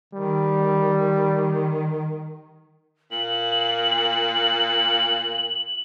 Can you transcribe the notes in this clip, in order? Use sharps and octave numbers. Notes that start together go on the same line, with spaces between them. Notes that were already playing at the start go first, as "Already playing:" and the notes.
D#3 G3
A#2 F#7